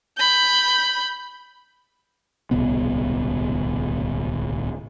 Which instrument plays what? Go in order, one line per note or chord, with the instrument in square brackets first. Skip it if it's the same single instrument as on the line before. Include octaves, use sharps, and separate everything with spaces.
[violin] B5 G6
[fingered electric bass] D1 C2 B2 B3